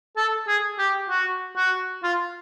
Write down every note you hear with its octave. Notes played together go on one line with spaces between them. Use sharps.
A4
G#4
G4
F#4
F#4
F4